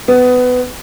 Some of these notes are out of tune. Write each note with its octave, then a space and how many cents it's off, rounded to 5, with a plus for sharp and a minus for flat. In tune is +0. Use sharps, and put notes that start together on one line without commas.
B3 +20